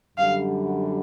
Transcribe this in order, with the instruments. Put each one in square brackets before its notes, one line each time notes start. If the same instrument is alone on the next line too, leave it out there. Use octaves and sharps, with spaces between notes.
[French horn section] F#2 D3 G3 [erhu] F5